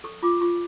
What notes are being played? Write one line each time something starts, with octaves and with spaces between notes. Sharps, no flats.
A4 C#6
F4 D6
F4 C#6